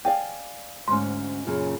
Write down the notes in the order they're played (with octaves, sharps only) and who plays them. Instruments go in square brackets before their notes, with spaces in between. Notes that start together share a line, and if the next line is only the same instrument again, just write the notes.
[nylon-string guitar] D5 F5 G#5 [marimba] G5
[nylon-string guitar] D2 G#2 C#4 [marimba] C6
[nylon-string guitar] F#2 A#2 C#3